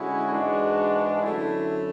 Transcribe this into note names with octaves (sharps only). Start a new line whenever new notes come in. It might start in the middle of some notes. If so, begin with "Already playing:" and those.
Already playing: D3 G#3 C#4 E4 F#4
G#2 E3 G#3 D4
F#2 D3 A3 E4